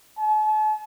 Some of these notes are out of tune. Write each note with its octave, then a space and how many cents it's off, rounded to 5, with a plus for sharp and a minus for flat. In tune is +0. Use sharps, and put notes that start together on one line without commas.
A5 -45